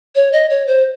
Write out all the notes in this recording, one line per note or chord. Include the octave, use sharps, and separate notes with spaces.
C#5
D#5
C#5
C5